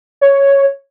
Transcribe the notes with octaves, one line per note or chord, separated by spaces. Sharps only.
C#5